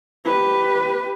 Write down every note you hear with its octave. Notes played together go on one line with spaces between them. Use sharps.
G4 B4